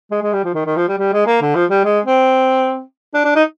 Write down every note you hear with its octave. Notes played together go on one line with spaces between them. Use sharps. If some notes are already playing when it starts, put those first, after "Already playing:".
G#3
G#3
G3
F3
D#3
D#3
F3
G3
G3
G#3
A#3
D3
F3
G3
G#3
C4
D4
D4
D#4